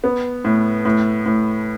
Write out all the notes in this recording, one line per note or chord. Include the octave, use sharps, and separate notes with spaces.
B3
A2
A2
A2